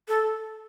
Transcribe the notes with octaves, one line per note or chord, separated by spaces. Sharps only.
A4